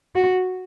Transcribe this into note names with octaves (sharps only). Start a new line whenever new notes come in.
F#4